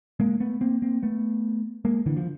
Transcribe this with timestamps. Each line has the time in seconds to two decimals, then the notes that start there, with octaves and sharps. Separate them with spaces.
0.20 G#3 A#3
0.40 A3 B3
0.61 A#3 C4
0.82 A#3 C4
1.03 A3 B3
1.85 G#3 A#3
2.06 D3 E3
2.17 F3